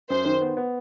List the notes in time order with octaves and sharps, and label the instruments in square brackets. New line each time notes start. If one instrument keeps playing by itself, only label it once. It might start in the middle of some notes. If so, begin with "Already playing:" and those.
[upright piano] F#2 [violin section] C5
[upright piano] D#3
B3
B3